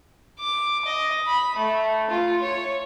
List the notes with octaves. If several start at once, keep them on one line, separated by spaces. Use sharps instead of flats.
D6
D#5
B5
A3
F4
C#5